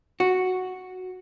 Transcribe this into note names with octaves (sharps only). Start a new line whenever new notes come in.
F#4